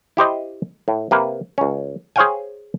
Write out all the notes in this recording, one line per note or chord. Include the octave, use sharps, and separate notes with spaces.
E4 G4 C5 D#5
A2
C3 A#3 B4
C#2 C#4
G#4 C5 C#5 F5 G5 G#5